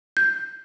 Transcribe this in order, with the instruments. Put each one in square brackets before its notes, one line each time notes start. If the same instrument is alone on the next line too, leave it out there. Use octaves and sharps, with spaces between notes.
[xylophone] G6